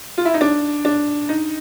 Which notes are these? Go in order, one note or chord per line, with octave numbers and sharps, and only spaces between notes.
F4
E4
D#4
D4
D4
D#4